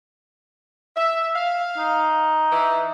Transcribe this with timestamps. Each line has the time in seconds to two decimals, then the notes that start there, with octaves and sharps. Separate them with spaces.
0.96 E5
1.34 F5
1.78 D#4
2.51 E3